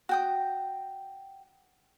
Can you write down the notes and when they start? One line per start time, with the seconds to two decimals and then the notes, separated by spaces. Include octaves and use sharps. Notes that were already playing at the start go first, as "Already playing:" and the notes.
0.09 F#4 G5 D#6